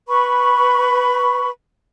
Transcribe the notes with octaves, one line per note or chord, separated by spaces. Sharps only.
B4 B5 C#6